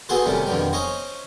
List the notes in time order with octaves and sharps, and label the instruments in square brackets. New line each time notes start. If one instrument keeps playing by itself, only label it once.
[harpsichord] B3 F#4 G#4 A4 B4 C5
C3 D#3 G3 A3 C#4
F2 B2 D3 D#3 G3
C#4 C5 C#5 D#5